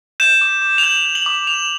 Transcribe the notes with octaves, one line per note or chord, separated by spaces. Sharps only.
G6 E7
D6
D6
F7
G6 F#7
G6
F#7
D6
D6 F7